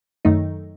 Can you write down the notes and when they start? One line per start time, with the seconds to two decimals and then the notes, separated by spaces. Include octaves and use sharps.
0.25 F#2 D#3 A3 D#4